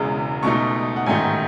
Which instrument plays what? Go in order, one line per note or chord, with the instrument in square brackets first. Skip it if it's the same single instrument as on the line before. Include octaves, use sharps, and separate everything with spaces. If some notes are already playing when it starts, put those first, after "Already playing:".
Already playing: [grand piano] E1 E2 C#3 G#3
C#2 B2 A3 D#4 C#6
F#5
A1 G#2 D#3 A3 D#4 G#5